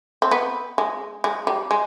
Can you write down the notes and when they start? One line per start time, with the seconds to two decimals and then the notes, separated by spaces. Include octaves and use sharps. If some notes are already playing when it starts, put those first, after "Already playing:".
0.22 C4
0.31 B3
0.78 G#3
1.24 G#3
1.47 G3
1.71 G#3